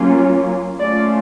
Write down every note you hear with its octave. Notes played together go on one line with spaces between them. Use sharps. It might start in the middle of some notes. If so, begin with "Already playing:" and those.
Already playing: F#3 A#3 C#4 F4
A3 C#4 F4 D5